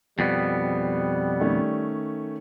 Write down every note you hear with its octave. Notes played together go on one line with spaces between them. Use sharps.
F2 B2 G3 B3
D#3 A3 C#4